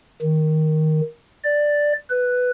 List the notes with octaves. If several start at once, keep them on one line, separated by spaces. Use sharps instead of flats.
D#3
D5
B4